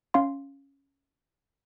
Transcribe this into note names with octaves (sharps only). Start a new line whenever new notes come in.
C#4 F5 C6